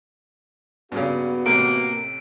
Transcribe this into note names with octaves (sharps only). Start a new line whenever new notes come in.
G2 A#2 C#3 B3 F#4
A1 A2 C3 A#3 D7